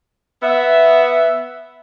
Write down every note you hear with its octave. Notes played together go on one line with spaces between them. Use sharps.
B3 E5